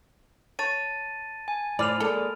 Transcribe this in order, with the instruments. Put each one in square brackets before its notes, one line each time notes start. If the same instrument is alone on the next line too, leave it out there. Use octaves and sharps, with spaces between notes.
[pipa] C#5 [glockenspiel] A5 A6 D#7
[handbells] G#5
[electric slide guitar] A2 E4 C5 [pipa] D5 [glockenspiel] B5 F6 F7
[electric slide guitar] G#3 A#3 D5 [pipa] A4